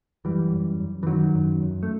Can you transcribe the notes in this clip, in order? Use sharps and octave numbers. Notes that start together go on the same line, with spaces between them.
F#2 E3 G3
F#2
F#2
E3
F#2 D#3 F#3
F#2
F#2
A3